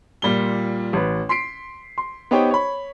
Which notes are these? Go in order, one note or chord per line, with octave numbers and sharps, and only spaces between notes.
A#2 G3 F4 G7
A1 B4
C6 B6 C7 D7
C6
B3 D#4 G4 C5 C#5 G5
C#5 B5